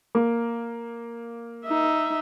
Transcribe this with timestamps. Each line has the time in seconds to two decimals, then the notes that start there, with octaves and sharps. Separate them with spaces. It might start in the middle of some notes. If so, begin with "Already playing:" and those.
0.15 A#3
1.66 D#4 E5